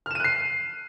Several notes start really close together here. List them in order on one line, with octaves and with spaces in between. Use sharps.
F6 E7 D#7 F#6 C7